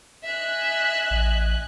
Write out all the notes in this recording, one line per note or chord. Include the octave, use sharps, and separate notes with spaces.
D#5 E5 G#5 F#6
A1